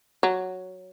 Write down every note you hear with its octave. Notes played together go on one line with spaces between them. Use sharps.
F#3